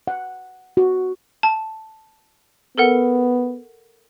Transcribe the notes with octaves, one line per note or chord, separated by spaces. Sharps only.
F#5
F#4
A5
B3 A4 A#4 F#5